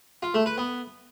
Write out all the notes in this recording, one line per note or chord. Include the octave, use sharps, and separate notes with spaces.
F4
A3
B4
B3